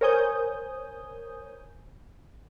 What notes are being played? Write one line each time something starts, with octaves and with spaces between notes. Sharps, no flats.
A#4 C5 C#5 G#5 D#6 G6